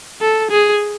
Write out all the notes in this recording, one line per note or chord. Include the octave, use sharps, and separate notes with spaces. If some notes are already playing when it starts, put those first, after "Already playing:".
A4
G#4